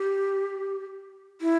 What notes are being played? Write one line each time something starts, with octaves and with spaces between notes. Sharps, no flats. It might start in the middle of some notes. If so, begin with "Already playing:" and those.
Already playing: G4
E4